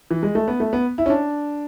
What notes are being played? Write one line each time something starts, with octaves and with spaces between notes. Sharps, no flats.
E3
G#3
A3
B3
A3
B3
E4
C#4
D4